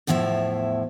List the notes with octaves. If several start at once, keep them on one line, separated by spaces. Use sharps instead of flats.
E2 A2 F3 E4 E5